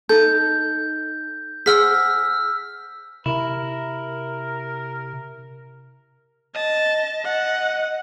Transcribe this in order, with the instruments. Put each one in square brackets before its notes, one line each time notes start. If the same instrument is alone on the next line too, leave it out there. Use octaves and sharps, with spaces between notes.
[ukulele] D#4 A4 [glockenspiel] G6
[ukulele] G#4 C5 F#5 [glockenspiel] E6 F6 B6
[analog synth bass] C3 [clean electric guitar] E4 [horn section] A#4
[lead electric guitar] D#5 [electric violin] A5
[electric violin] F#5